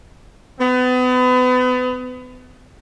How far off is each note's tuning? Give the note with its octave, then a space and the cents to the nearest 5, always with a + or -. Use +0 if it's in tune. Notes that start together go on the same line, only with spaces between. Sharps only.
B3 +35